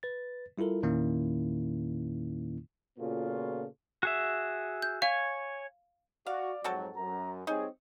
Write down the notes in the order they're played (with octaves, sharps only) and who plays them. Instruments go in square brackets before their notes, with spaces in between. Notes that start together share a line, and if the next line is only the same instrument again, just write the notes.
[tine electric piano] B4 A6
G3 E4 F4 A4 A#4
E2 A#2 D#3 A#3 C#4 E4
[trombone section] A#2 C#3 B3 F4 F#4 A4
[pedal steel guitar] F#4 G#4 E5
[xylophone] G6
[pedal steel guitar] C#5 G#5 [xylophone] F5
[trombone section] F#4 [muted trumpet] D5 [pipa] F5
[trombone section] F2 G#2 F#3 [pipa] C4 F#4 A4
[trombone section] F#2 [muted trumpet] A#5
[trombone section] G3 C4 G#4 [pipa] D#4 [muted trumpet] C#5